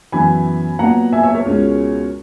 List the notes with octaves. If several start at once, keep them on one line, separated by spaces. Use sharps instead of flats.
F#2 E3 B3 G#5 B5
A#2 F#3 B3 F#5 A#5
E5 G#5
C#5 E5
A#4 C#5
C#2 B2 G#3 C#4